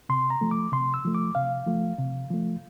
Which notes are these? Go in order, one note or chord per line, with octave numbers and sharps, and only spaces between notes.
C3 C6
A#5
F3 A3
D6
C3 C6
E6
F3 A3
D6
C3 F5
F3 A3
C3
F3 A3